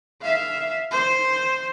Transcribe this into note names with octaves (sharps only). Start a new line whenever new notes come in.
E5 F5
C5